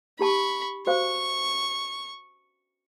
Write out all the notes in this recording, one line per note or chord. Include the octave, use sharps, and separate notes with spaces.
D#4 G4 A5 B5 C#6
F#4 C5 F5 C#6